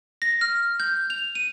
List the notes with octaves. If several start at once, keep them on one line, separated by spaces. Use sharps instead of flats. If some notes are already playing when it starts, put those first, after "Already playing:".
A#6
F6
G6
F7
D#7